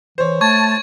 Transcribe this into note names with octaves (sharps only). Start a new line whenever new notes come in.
E3 C5 C#5
A3 A5 C#6 G#6